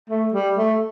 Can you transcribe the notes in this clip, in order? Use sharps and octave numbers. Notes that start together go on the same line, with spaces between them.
A3
G3
A3